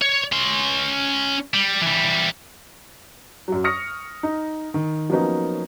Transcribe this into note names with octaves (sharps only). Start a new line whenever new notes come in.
C#5
C#4 C6
G3
E3 G3
F#2 F#3
C#6 D#6 F6 A#6 C#7
D#4
D#3
F3 F#3 A#3 B3 C#4 D#4